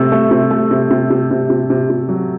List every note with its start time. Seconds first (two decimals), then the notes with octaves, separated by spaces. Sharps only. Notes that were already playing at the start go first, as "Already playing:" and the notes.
Already playing: C3 A3 E6
0.12 A3
0.31 C3
0.51 A3
0.71 C3
0.91 C3
1.10 C3
1.31 C3
1.50 C3
1.70 C3
1.90 C3
2.09 F#3